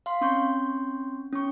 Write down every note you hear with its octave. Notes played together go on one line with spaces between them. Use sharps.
F5 C6
C4 C#4 C6 C#6 G6
C#4 C#6